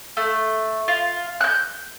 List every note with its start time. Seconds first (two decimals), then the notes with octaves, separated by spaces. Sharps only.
0.17 A3
0.88 F4
1.41 F#6 G6